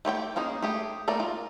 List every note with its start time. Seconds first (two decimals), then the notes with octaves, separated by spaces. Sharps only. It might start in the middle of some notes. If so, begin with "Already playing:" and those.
0.05 A3 G4 C#5 G5
0.36 A#3 C#4 D#4 G#4
0.62 A3 G4 G#4
1.08 A3 A#3 A#4 D5
1.20 F4